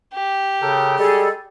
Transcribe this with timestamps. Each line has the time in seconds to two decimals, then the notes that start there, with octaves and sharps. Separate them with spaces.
0.14 G4
0.62 C#3 A4 A#4 G5
0.98 G3 G#3 G#4 A4